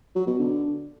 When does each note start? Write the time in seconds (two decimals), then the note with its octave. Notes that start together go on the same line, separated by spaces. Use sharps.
0.16 F#3
0.27 B2
0.39 D3